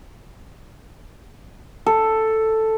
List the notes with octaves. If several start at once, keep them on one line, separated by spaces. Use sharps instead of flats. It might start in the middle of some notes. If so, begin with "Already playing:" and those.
A4